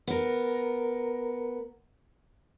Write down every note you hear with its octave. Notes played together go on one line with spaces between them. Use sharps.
B3 A#4